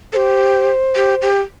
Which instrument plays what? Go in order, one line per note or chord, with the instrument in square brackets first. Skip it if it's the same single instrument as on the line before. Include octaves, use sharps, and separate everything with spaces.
[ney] G4 A4 [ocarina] C5
[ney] G4
G4